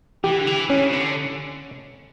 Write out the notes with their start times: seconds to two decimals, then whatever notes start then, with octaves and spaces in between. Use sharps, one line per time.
0.24 E3 G4
0.38 D3
0.47 E3
0.69 E3 C#4
0.82 C#3
0.93 D3